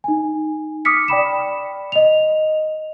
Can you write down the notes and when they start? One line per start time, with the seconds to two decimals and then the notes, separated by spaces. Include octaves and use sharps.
0.04 D#4 G#5
0.85 D6 D#6 F6 B6 C#7
1.08 D5 G5 B5 E7
1.92 D#5 F7